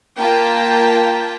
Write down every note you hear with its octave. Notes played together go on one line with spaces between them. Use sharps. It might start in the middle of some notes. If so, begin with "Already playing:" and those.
A#3 F4 G5 A5 B6